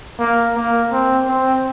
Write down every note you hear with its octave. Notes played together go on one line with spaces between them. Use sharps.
A#3
A#3
C4
C4